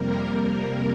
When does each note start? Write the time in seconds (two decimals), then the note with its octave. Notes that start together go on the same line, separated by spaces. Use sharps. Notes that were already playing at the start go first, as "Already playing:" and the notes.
Already playing: F2 C3 G3 A#3 A#4
0.35 A#4